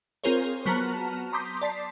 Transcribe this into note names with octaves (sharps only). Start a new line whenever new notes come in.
C4 F4 G#4 A#4 C5 C#5
F#3 B3 F#4 A5 A#5 F6
A#5 C6 D6 D#6 G6 B6
D5 A5 B6 C7